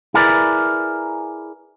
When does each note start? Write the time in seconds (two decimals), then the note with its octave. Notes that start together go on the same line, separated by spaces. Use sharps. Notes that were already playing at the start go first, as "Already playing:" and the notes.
0.14 E4 G#4 A#4 B4 D5